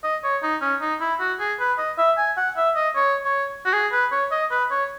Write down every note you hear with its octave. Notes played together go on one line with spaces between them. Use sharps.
D#5
C#5
D#4
C#4
D#4
E4
F#4
G#4
B4
D#5
E5
G#5
F#5
E5
D#5
C#5
C#5
F#4
G#4
B4
C#5
D#5
B4
C#5